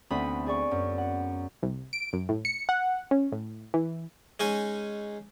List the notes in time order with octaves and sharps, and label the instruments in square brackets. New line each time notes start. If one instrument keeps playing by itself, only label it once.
[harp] D2 A3 B3 C4 B5 D#6
G#4 D5 C#6
F#2
F#5
[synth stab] C2
D7
F#2
A2
C#7
F#5
C#4
A2
E3
[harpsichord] G#3 C#4 D#4 G#5